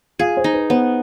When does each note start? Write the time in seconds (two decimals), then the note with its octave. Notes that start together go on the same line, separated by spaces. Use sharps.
0.19 F4 G#4 F5
0.37 C5
0.44 D#4
0.53 B4
0.70 B3 C5